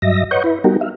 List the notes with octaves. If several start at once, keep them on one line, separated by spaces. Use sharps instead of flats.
G2 F#3 D#5 E5 A#6
B4 C#5 D#5 F#5 C#6 G6
E4 B4
G3 B3 D#4 F#4 G4 A#4
E5 F5